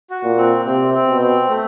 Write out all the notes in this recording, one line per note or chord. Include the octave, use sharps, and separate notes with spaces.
F#4
A#2
C4
C3 C4
C4
B2
C4
A3